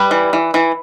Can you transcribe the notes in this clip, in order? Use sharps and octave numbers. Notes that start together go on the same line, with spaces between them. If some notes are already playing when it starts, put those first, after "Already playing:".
Already playing: G3 B4
E3
E3
E3